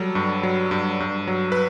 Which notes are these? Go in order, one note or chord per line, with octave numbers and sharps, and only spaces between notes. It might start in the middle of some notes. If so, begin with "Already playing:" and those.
Already playing: F#3 G3 A4
G2
F#3
G2
G2
F#3
B4